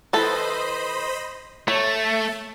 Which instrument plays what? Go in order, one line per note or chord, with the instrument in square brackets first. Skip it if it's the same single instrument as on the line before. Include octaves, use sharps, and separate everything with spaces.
[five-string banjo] E3 A4 [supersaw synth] C5 D#5 B5
[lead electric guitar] A3 [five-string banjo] C#5 [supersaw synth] A5